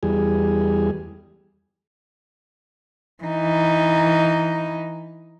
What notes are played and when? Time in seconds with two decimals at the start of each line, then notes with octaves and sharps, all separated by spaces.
0.03 E2 G3 G#4
3.24 E3 D#4